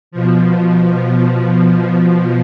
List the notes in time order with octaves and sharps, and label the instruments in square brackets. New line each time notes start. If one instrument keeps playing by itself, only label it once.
[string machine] B2 F3